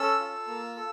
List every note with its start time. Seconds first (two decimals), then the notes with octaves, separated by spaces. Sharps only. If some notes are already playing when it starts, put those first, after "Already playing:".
Already playing: C#4 A4 E6
0.20 F4
0.47 A#3
0.76 A4